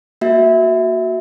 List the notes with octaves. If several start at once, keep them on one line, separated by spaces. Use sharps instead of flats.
A#3 F#4 E5